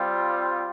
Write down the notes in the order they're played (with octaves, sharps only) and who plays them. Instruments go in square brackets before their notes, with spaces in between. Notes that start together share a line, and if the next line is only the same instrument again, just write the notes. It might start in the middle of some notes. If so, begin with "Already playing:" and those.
Already playing: [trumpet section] G3 C4 F4